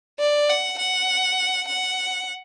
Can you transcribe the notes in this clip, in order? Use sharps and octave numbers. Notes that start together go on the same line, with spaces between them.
D5
F#5
F#5
F#5